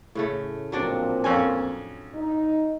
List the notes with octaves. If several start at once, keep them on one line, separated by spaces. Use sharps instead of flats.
A2 C#3 A3
A#2 F3 F#3 C4 D4 D5
F2 C#4 G#5
D#4